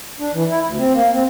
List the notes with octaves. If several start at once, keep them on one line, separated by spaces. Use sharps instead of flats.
D4
E3
E4
D2
C4
A#3
C4